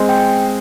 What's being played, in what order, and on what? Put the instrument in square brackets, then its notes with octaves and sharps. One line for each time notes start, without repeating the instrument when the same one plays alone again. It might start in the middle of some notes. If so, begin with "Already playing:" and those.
Already playing: [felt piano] G#3 C4
[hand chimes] G5